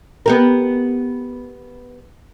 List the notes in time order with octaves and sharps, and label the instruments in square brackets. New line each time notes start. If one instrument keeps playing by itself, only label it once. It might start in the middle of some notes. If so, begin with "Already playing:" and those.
[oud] B3 G4 A#4